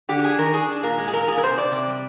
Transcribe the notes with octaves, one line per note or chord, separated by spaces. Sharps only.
D3 G4
G4
D4 G#4
D#3 A#4
D4 G#4
D4
A#2 A#4
G#3
G#4
A#2 A#4
A#2 G#4
A#4
C3 C5
C3 D5
C3
G3